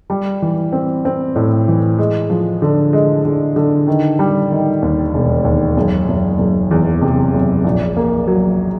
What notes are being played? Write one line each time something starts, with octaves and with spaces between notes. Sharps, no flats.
G3
E3
C4
C4
A2
E3
G#3
F3
D3
G#3
D3
D3
D#3
G3
D#3
D#2
E1
D#2
F#1
F#1
F#1
E2
C3
F#1
A#1
A#3
F#3